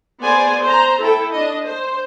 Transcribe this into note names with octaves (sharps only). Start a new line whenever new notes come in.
B3 G#4 C5 D5 G#5
C5 A#5
E4 A4 G5
D4 D#5
C5